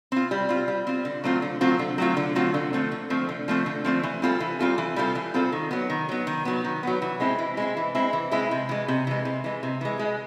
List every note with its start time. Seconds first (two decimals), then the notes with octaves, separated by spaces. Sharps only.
0.12 C4 F4
0.31 G3
0.49 C4 F4
0.68 G3
0.87 C4 F4
1.05 D3
1.24 F#3 A3 C4 F4
1.42 D3
1.61 F#3 A3 C4 F4
1.79 D3
1.98 F#3 A3 C4 F4
2.17 D3
2.35 F#3 A3 C4 F4
2.54 D3
2.73 F3 A3 C4
2.92 D3
3.10 F3 A3 C4
3.29 D3
3.48 F3 A3 C4
3.66 D3
3.85 F3 A3 C4
4.03 E3
4.22 G3 C4 F4 A4
4.40 E3
4.59 G3 C4 F4 A4
4.78 E3
4.96 G3 C4 F4 A4
5.15 E3
5.34 G3 C4 F4 A4
5.52 D#3
5.71 F#3 B3
5.90 D#3
6.09 F#3 B3
6.27 D#3
6.45 F#3 B3
6.64 D#3
6.83 F#3 B3
7.02 E3
7.20 G#3 C4 E4
7.39 E3
7.57 G#3 C4 E4
7.77 E3
7.95 G#3 C4 E4
8.13 E3
8.32 G#3 C4 E4
8.51 C3
8.69 E3 G#3
8.88 C3
9.07 E3 G#3
9.25 C3
9.44 E3 G#3
9.63 C3
9.81 E3 G#3
9.99 G#3